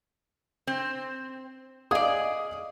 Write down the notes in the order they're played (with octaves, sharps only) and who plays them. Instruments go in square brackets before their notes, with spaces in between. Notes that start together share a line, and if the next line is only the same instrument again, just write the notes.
[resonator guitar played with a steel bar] C4
[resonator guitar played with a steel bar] G#4 D5 [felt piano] D#5 F5 D#6